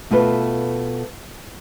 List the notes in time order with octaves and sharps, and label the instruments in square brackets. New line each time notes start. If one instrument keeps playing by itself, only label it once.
[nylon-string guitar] B2 A3 F4 B4